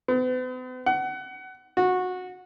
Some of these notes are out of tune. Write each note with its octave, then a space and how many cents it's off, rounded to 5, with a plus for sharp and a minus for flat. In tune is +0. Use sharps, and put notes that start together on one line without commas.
B3 +45
F#5 +25
F#4 -15